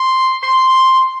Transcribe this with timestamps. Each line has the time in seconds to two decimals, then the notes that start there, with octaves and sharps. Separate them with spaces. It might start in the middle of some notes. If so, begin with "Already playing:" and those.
Already playing: C6
0.43 C6